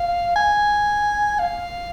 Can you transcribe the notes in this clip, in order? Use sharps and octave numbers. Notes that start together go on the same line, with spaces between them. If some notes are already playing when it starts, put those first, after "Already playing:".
Already playing: F5
G#5
F5